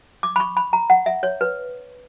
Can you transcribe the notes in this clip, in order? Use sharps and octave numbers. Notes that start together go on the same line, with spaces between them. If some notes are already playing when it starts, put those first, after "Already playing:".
D6
B5
C#6
B5
A#5
F#5
E5
C#5
B4